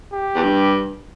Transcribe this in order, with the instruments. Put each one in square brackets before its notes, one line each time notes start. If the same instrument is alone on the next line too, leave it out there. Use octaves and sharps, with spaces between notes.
[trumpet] G4
[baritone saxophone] E2
G2